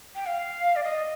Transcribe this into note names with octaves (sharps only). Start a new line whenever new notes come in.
G5
F5
D5
D#5